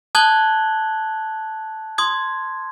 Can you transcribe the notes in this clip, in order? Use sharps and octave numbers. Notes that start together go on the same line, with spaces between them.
A5 D#6 F#6 G#6 F#7 G7
C6 D#6 G#6